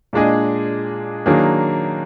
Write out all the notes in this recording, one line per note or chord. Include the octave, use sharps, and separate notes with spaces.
A#2 G#3 D4 G#4 D#5
D#3 F#3 A#3 D4 G#4